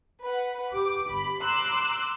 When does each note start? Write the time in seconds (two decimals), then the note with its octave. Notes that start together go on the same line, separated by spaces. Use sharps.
0.23 B4 F#5
0.72 G4 D6
1.11 G1 B5
1.42 A#5 C6 D6 E6 F#6